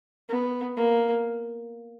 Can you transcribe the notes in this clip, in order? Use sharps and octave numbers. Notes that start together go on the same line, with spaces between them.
B3
A#3